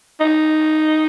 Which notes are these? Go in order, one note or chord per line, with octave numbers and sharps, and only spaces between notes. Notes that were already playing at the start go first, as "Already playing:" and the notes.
D#4